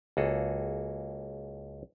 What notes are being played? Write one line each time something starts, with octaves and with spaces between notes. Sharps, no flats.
C#2 A#3 F#4 G#4 A4